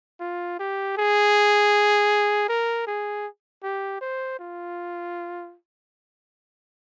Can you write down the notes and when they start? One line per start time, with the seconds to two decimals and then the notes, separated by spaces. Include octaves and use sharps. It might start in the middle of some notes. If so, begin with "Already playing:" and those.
0.20 F4
0.60 G4
0.97 G#4
2.49 A#4
2.87 G#4
3.63 G4
4.01 C5
4.40 F4